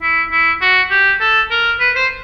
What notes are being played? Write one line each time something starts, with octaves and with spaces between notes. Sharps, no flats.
E4
E4
F#4
G4
A4
A#4
B4
C5